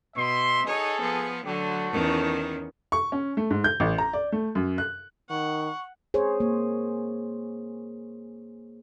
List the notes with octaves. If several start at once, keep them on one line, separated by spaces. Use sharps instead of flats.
B2 E5 C6
D#4 G#4 A4 C#5
F3 B3
D3 F#3 A3 F#4
E2 D#3 C#4
C#6
C#4
A3
G#2
G6
A1
A#5
D5
A3
F#2
F#6
D#3 F#5 C#6
G#4 C5 C#5
A#3